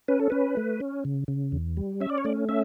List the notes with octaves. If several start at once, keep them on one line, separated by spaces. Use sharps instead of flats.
C#4 B4
A4
C#4 B4
A3
C#4
C#3
C#3
E2
G3
C#4 E5
D5
C#5
A3 D5
C#4 E5